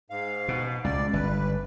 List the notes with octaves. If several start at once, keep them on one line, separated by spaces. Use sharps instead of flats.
G#2 F5
B2
C#2 D5
G1 B4